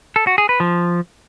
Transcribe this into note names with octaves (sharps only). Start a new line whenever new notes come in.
A4
F#4
G#4
B4
F3